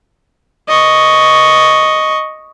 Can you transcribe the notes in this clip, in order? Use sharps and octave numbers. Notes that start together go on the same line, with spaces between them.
D#5 C#6